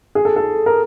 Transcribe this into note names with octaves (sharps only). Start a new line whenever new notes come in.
G#4
A4
A4
A#4